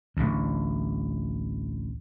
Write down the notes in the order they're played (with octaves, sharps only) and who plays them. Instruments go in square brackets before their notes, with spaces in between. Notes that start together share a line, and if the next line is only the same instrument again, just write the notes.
[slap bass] A1 D2